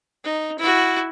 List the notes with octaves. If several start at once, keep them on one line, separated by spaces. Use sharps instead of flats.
D#4
E4 F#4